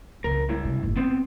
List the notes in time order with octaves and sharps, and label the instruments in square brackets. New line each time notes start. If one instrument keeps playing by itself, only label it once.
[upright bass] C#2 E3 [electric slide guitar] A#4
[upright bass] C#2 G#3 [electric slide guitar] G2 C#3 E4
[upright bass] C3
F#1 G#2
[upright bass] G3 [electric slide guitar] B3 C4